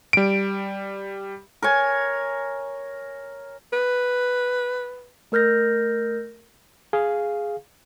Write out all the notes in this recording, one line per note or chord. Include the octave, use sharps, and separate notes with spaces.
G3 D7
A#4 C#5 G#5
B4
A3 A#4 F6 G6 A#6
G#4 F5